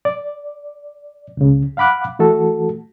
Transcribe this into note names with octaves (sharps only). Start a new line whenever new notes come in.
D5
C#2 C#3
F5 F#5 B5 D6 F#6
E3 A3 F#4 A4